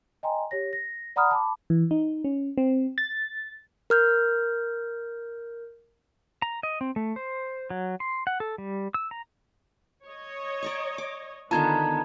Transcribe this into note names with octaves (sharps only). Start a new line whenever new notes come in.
D#5 G5 G#5 A#5 C6
G4 C#5 A#6
A#6
D5 F#5 A#5 B5 D#6 F6
A5 B5 D6
E3
D#4
C#4
C4
A6
A#4 F6 G6
A#5
D#5
C4
A3
C5
F#3
C6
F#5
A4
G3
E6
A#5
C#5 D#5
D5 A#5 C#6
D6
D3 D#3 B3 F4 A5 A#5 G#6